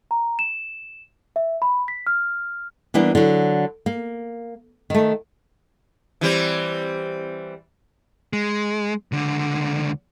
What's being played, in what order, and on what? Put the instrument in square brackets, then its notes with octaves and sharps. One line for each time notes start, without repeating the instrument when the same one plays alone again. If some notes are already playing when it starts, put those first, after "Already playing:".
[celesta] A#5
E7
E5
B5
B6
F6
[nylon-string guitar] E3 G3 A#3 B3 D4
D3 F#3
A#3
D#3 A3
[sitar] E3 G3 C4
[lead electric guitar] G#3
C#2 D3